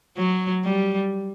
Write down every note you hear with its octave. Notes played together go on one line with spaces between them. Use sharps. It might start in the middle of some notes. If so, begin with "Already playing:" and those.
F#3
G3